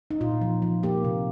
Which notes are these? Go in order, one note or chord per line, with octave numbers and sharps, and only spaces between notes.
D#4
A#2 F4
F3
F3
A#3 G4
C3